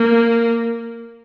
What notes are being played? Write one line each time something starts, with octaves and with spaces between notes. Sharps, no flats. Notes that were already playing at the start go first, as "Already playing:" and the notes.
Already playing: A#3